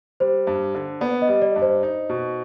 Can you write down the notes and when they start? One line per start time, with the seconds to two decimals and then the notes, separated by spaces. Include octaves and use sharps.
0.20 G3 C5
0.47 G2
0.75 D3
1.01 B3 D5
1.22 D#5
1.29 G3
1.42 D5
1.56 G2
1.62 C5
1.83 D#4
2.09 B2